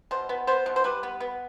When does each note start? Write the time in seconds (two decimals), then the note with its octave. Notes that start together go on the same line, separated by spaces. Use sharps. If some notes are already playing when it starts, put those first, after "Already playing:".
0.11 B2 C5
0.29 B3
0.47 B3 C5
0.66 B2
0.76 C5
0.84 G3 B4
1.03 B3
1.20 B3